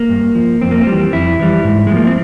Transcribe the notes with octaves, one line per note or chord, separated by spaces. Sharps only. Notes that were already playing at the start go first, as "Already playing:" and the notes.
Already playing: A#3
G2
F3
F2 C4
A#3
C4
E3 G3
F2 E4
E3 G3
G#2
G#3
F3
A#3
C4